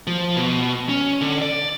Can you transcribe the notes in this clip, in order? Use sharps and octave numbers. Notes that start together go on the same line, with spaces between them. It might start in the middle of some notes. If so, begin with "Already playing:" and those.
F3
B2
C#4
D3
D5